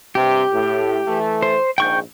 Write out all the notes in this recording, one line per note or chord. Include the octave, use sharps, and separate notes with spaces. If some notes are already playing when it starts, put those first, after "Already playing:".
G2 C3 G4
A2
E3 A3
C5
A#1 G#2 G5 C#6 G6